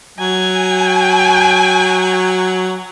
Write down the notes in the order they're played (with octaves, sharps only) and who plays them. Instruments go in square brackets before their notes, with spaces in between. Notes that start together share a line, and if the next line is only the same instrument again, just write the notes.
[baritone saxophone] F#3 [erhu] G#5